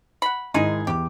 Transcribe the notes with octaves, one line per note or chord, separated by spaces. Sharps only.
F#5 B5
G#2 D#3 G#3 D#4 E4 G#4
E2 G4 D6